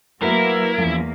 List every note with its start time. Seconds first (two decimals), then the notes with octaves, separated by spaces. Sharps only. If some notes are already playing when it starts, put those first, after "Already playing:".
0.22 F#3 A3 A#3 E4 F#4 A#4 B4 E5
0.78 E2 F3 A#3 C#4